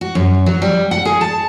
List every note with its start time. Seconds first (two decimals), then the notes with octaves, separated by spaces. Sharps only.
0.01 F#4
0.15 F#2
0.46 F#3
0.62 G3
0.91 F#5
1.05 G#4
1.21 A5